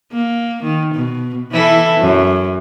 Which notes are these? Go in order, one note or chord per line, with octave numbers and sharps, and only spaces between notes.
A#3
D#3
B2
E3 E4 A4
F#2